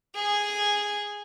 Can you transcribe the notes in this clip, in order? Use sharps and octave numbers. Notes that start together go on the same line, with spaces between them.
G#4